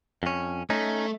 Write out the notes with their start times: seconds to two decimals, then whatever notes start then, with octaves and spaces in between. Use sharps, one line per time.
0.23 F2 C#4
0.70 A3 C#4 D#4